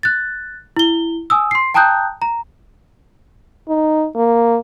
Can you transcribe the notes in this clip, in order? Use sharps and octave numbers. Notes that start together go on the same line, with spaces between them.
F#6 A6
E4 G7
G#5 D#6 E6
C6 C7
G5 A5 A#5 D#6 F#6 G6
A#5
D#4
A#3